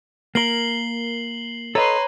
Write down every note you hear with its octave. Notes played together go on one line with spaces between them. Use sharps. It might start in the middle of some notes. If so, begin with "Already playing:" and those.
A#3 A#4 C7 F#7 G7
A4 B4 C#5 D#5 A#5 C6